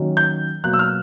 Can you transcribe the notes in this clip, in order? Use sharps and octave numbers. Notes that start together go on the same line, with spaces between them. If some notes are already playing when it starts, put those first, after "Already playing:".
Already playing: D#3 F#3 A#3 C#4
G6
B2 F#3 A#3 F#6
E6
F6